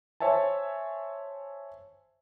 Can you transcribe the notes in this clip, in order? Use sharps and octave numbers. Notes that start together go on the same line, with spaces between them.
C5 C#5 E5 G#5 A5